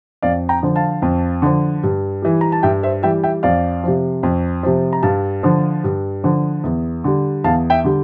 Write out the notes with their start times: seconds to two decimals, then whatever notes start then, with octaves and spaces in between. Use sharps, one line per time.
0.22 F2 D5 F5
0.49 G5 A#5
0.63 D3 F3
0.76 F5 A5
1.02 F2
1.42 D3 F3
1.83 G2
2.22 E3 G3
2.41 A#5
2.52 A5
2.63 G2 E5 G5
2.83 C5 E5
3.02 E3 G3 E5 G5
3.24 E5 G5
3.43 F2 D5 F5
3.84 C3 F3
4.23 F2
4.63 C3 F3
4.93 A#5
5.03 G2 F5 A5
5.43 D3 F3
5.84 G2
6.24 D3 F3
6.64 E2
7.04 D3 G3
7.44 E2 F5 A5
7.70 E5 G5
7.84 D3 G3